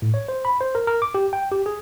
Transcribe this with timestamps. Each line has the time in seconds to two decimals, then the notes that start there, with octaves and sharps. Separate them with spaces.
0.02 A2
0.14 C#5
0.29 C5
0.45 B5
0.61 C5
0.75 A#4
0.87 A#4
1.02 D6
1.15 G4
1.33 G5
1.51 G4
1.66 G#4